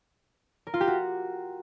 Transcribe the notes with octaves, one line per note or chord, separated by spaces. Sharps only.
A#4
F4
G4
F#4